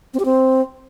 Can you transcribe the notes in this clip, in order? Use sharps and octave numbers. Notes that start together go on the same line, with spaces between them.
C4
G4
C4